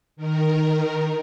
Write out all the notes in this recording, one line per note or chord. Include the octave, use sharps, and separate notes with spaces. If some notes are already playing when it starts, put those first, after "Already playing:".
D#3 A#4